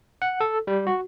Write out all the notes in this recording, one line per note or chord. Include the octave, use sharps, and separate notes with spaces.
F#5
A4
G3
F#4